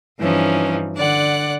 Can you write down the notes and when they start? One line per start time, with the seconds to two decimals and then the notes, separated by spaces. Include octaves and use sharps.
0.21 G2 E3 F3 C#4 D#4
0.96 D3 D5 F#5 F#6